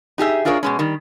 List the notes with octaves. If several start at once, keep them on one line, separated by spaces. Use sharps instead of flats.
D#4 G4 G#4 E5
D4 F4 G#4 A#4 C#5
B2 G#3 C#4
D#3 G3